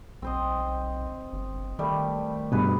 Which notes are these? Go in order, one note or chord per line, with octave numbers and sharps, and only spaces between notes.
B1 C4 C5 D#5
G1
D#3 G3 A3
G2 B2 G#4 B4